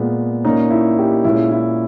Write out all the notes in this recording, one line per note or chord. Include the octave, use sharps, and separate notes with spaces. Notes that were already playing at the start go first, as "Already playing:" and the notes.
Already playing: A#2 G#3 B3
A#2 A#3 C#4 D#4
E4
G4
A#2 G#3 C#4 E4
E4